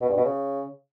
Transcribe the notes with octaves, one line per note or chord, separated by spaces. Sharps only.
B2
G2
B2
C#3